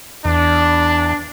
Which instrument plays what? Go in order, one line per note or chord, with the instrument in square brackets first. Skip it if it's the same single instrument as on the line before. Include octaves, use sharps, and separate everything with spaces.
[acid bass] E2 [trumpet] D4